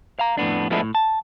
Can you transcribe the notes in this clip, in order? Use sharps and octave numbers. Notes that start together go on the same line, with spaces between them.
F5 A#5
F2 A2 B3 D4
F3 G#3 A3 B3 D4 E4
A2
A5